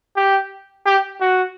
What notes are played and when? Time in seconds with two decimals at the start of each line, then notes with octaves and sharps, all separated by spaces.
0.16 G4
0.86 G4
1.21 F#4